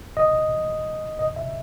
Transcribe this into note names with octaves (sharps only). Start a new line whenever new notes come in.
D#5
D#5
E5